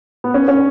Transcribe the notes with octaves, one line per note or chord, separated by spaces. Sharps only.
B3
C#4
C#4